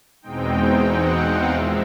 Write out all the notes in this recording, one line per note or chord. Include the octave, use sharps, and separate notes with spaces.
E2 B2 G#3 C4 D#4 G5
F#5
F5
A#2 F3 G#3 C4 E5